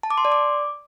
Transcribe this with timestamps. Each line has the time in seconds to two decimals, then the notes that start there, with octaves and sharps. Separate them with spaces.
0.03 A5
0.10 D6
0.18 C6
0.25 D5
0.32 D6